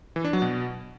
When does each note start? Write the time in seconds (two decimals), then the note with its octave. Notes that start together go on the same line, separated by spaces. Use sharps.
0.16 E3
0.25 D4
0.33 F#3
0.42 B2